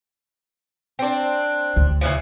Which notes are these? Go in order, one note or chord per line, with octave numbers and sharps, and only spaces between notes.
C4 D4
D2
C#3 E3 F3